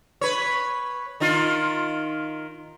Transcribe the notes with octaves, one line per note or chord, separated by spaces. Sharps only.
B4 C#5
D#3 D#4 F4